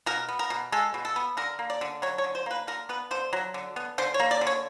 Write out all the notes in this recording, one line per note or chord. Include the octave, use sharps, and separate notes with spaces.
B2 A#4
B3
A#4
B2
G#3 A4
B2
A4
B3
D3 A#4
A#3
D5
D3
F#3 C#5
C#5
D3
C5
A#3 B4
D3 A#4
B3 B4
D3 C5
F#3
D3
B3
D3 C5
C#5
A#3
D5
D3
C#5